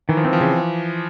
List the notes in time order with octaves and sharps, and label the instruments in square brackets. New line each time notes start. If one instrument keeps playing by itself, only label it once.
[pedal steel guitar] D#3 [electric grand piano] E3
[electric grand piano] F3
[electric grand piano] E3 [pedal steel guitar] C4
[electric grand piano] F3
[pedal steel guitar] C#3 [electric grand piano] E3